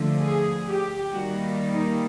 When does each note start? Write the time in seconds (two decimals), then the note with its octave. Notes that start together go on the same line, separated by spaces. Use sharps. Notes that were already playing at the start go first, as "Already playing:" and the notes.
Already playing: D3 F3 A3
0.24 G#4
0.68 G4
1.12 D#3 G3 A#3 F#4
1.71 D#4